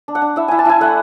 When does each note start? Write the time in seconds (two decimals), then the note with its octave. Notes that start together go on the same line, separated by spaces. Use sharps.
0.08 D4
0.15 F#5
0.22 D4
0.36 E4 E5
0.48 E4 G#5
0.59 A5
0.66 E4 G#5
0.80 A3 F#5